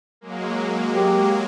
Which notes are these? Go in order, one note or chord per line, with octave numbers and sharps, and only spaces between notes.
F#3 G#3 A#3
G4